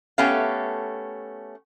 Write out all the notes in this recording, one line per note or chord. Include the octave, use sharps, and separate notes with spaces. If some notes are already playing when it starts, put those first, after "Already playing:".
A3 B3 C#4 G4 F5